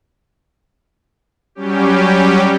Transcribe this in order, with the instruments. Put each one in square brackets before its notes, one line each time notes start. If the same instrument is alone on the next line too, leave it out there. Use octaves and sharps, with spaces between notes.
[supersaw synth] F#3 G3 C#4 G4